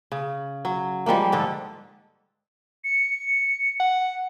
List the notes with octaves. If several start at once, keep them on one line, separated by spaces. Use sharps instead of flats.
C#3
F#3
F3 G3 G#3 A#3
G#2 D3 A4
C#7
F#5